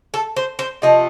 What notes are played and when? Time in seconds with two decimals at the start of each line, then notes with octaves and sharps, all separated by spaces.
0.14 A4
0.36 C5
0.59 C5
0.82 C3 F3 A3 D#5